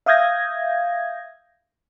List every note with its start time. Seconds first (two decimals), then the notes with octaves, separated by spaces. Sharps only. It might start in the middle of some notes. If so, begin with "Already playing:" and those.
0.06 E5 F5 D#6 G6 G#6 A#6